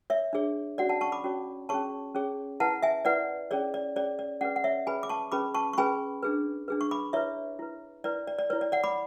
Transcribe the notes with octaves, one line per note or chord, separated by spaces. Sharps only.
C#5 E5
D4 G#4 C#5
C#4 F#4 C#5 D5 F#5
F#5 A5
A5 C#6
B5 D6
C#4 F#4 C#5
C#4 G#4 C#5 A5 C#6
C#4 G#4 C#5
E4 B4 F#5 A5
E5 G#5
E4 B4 D5 F#5
C#4 G#4 C#5 D5
D5
C#4 G#4 C#5 D5
D5
C#4 G#4 B4 D5 F#5
F#5
C#5 E5
C#4 G#4 B4 G#5 B5
D6
A5 C#6
C#4 G#4 B4 B5 D6
A5 C#6
C#6
C#4 G#4 B4 G#5 B5
D4 G#4 B4
D4 G#4 B4
C#6
B5 D6
E4 B4 C#5 E5
E4 B4
E4 B4 D5
D5
D5
E4 B4 C#5
D5
D5 F#5
B5 D6